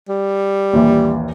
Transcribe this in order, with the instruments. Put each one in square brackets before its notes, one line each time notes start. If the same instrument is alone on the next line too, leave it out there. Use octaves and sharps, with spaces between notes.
[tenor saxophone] G3
[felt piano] A#1 D#2 E3